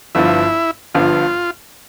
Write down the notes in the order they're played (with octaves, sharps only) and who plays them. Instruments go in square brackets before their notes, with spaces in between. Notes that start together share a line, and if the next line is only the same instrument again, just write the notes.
[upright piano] G1 G2 F3 [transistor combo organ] E4
[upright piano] G1 G2 F3 [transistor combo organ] F4